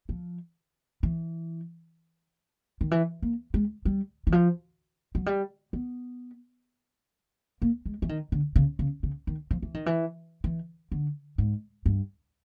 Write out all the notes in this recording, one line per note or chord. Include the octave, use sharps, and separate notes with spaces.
F3
E3
D#3
E3
A#3
G#3
G3
E3
F3
F#3
G3
B3
A#3
G#3
E3
D#3
D3
C#3
C#3
C#3
D#3
F3
E3
D#3
E3
E3
D3
G#2
G2